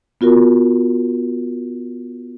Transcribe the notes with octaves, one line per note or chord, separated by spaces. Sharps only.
B3 F4 F#4 A#4